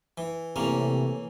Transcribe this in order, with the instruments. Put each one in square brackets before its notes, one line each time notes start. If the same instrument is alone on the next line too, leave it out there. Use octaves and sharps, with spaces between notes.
[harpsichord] E3
[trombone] A2 [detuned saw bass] C3 [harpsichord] E3 A#3 C#4